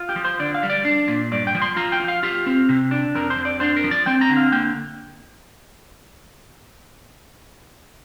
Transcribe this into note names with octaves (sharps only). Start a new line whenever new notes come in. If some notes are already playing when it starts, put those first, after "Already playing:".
Already playing: F4
G4
F3
C5
D3 D5
F5
G3
D5
D4
A#2
G2 D5
G5
F3
C6
F4 A#5
G5
F4
F5
F4 G4
C4
C3
D4
F2 A#4
C5
F2
D5
D4 C5
A#4
F3
D5
C4 G5
A#5
D3
F5
A#3 G5